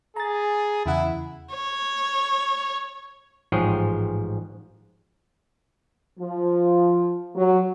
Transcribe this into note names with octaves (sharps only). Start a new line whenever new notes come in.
G#4 A#5 A6
E2 C#3 E4 F#5
C#5
A1 G#2 F3 G#4 C#5 G5
F3
F#3